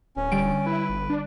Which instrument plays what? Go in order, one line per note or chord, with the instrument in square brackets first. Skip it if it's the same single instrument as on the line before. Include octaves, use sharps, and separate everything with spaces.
[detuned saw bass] D1 [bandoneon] C#4
[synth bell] D3 G3 D7
[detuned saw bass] E4 [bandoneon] B4
[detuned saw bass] G1
D4